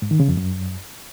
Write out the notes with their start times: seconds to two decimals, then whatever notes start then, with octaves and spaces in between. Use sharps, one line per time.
0.02 G#2
0.11 D#3
0.20 C#3
0.28 F2
0.37 F#2